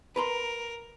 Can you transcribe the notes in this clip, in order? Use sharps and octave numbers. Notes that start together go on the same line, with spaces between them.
A#4 B4 A#5 C6